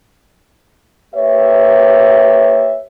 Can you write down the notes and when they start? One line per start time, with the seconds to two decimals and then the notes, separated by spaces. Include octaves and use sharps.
1.14 A#3 G4 B4 C#5 E5